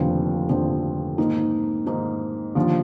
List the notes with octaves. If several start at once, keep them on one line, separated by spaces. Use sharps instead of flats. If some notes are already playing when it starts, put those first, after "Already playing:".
Already playing: F1 D#2 D3 F3 C4
F1 D#2 D3 F3 C4
G#2 D#3 A#3 D#4
G#2 D#3 A#3 D#4
D#2 D3 F3